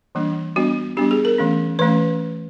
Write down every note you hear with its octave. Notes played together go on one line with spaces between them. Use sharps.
E3 G3 A#3 D4
G3 B3 D4 F#4
G3 B3 D4 G4
G#4
A#4
E3 A3 C#4
E3 A3 C#4 B4